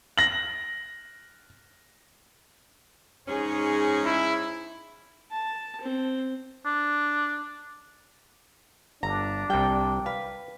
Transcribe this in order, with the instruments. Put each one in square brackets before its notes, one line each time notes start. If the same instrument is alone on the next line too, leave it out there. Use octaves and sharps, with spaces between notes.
[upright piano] A#6 F#7
[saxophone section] G#2 C#4 [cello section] D#4 G#4 C#5
[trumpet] E4
[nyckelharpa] A5
C4
[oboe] D4
[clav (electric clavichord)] G1 [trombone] D4 [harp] A#5
[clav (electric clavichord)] C2 G3 [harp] G5
[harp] B4 [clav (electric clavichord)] F5